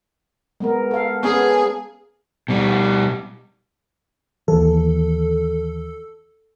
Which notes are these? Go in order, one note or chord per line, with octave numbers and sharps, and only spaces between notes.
G#3 B3 A#4
A4 F5
B3 C#4 G#4
B2 G3
D#2 E3 A4